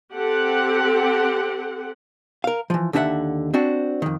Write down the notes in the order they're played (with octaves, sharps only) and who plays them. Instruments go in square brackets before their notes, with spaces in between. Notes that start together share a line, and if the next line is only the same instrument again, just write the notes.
[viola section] C4 G4 A4 F#5
[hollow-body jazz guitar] A#4 F5
E3 F3
D#2 D3 D4 E4 E5 F#5
C4 D4 F#4
F2 D#3